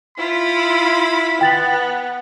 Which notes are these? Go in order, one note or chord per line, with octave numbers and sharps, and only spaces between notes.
E4 F4 B5
B3 G5 A6 F#7